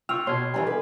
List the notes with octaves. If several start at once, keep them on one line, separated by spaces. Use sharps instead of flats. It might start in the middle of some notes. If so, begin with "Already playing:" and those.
F4 G5 C#6 E6 F6 F7
B2 C#5 C6 F6 G#6
D#3 E3 G3 G#5 A#5
A4 B4